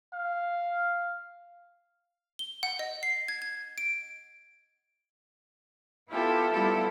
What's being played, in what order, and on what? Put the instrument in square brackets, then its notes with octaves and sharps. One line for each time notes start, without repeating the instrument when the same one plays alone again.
[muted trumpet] F5
[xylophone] G7
F#5
D#5
C7
G#6
G#6
D7
[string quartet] B3 E4 F4 G4 A4
G3 B3 E4 F4 G4 A4